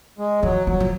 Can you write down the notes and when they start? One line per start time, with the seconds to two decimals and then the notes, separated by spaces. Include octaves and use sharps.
0.18 G#3
0.43 F3 F#3
0.67 F3 F#3
0.80 F3